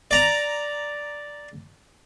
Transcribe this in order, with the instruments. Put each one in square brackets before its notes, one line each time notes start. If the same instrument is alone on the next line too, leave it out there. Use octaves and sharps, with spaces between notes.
[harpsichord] D5 A#5